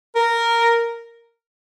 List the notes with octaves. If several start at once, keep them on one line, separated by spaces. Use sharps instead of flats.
A#4